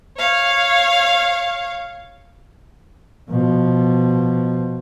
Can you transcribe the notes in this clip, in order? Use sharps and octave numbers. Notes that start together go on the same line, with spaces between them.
C#5 F5
B2 F3